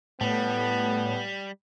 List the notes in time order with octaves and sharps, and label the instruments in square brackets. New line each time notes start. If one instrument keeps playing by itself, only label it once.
[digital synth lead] A2 [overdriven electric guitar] G3 [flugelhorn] B3